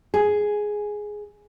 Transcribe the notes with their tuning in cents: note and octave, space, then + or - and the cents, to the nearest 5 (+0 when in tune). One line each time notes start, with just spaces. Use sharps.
G#4 +5